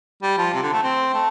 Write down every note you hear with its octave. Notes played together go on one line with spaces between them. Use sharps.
G3
F3
C3
D3
A3
C4
A3